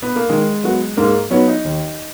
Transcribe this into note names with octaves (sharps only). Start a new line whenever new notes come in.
B3
A#3
D#3 G#3
F#3 B3 F#4
G#2 A#3
F#3 B3 C#4 D#4 F#4
D#4
D#2